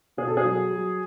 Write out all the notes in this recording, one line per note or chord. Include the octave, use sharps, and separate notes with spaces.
B2 G#4
A4
G#4
F#3
F#3